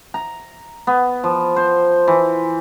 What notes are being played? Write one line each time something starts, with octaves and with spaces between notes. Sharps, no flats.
A#5
B3
F3
C5
E3